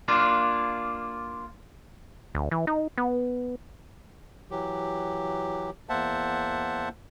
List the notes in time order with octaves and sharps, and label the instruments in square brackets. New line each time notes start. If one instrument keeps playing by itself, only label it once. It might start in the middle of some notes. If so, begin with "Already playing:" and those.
[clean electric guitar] A#3 D4 F4
[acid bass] D2
E3
D#4
B3
[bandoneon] E3 F#3 G4
E2 A#3 C5 E5 F#5 A5